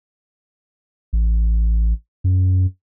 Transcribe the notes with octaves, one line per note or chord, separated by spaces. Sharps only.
A1
F#2